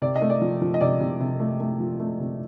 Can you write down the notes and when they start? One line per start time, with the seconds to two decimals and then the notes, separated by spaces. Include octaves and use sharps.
0.02 C3 D5
0.16 D#5
0.22 A3
0.30 D5
0.42 F3
0.62 F3
0.74 D#5
0.81 C3 D5
1.00 C3
1.20 C3
1.40 A3
1.60 A3
1.80 F3
2.00 A3
2.19 C3